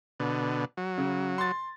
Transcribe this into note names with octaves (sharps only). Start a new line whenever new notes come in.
B2 D3
F#3
C#3
C6 A6